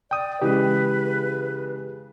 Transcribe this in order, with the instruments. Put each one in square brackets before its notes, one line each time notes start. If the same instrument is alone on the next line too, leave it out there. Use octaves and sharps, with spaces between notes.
[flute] D5 [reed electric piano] G5 D#6
[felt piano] C#3 E3 G#3 [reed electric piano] G4 [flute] B4